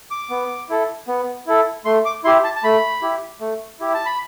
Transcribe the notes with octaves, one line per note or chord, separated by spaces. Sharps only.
D6
B3
E4 A4
B3
E4 A4
A3 C6
D6
E4 G4 C6
A5
A5
A3 B5
E4 G4
A3
E4 G4
A5
B5